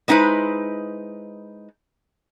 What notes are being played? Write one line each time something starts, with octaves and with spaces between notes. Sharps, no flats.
G#3 B3 D#4 E4 B4 C5